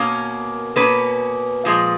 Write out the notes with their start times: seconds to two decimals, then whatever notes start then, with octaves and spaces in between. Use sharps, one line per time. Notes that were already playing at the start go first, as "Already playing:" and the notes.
Already playing: B2 A#3 C#4 A#4
0.76 B2 A#3 C#4 B4
1.65 A#2 F3 G#3